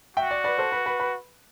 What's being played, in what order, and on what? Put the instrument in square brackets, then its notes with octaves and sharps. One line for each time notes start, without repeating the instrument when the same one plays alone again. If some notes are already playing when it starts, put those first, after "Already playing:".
[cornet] F#4 [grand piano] E5 G5
[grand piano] D5 F#5
B4 D5
A4 C5
B4
B4
B4